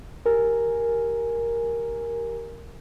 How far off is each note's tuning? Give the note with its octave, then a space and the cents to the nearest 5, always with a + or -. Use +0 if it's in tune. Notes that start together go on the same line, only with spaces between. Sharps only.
G4 -10 A#4 +0 G#5 +0